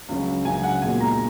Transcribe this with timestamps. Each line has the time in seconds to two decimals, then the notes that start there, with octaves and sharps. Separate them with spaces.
0.09 C#2 C#3 F#3
0.45 C#2 C#3 F#3 G#5
0.63 F#5
0.82 B1 A#2 G#3 G#5
1.01 A#5